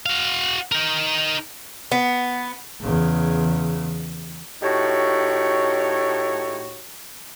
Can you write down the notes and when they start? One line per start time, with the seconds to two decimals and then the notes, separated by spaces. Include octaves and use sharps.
0.06 F#4 F5
0.72 D#4 A#4
1.91 B3
2.81 E2 C#3
4.62 A2 D#4 F#4 G4 C#5